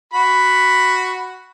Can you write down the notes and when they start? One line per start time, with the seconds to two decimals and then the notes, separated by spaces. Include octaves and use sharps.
0.14 F#4 B5